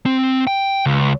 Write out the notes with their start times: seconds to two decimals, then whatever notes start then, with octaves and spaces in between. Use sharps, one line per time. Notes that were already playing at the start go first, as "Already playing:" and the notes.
0.06 C4
0.47 G5
0.86 C#2